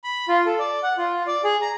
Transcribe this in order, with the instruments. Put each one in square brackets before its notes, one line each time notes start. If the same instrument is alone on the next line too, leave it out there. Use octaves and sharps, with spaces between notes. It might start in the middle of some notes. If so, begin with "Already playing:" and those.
[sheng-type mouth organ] B5
F4
A4
D5
F#5
F4
D5
G#4
A#5